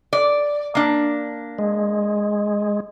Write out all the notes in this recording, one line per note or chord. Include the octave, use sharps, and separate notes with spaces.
D5
A#3 D4
G#3